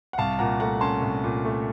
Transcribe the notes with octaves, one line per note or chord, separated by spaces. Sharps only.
F#5
C2 F5 A5
A#2 F#5 A#5
A3 F#5 A#5
C#4 A5 C6
C2
A#2
A3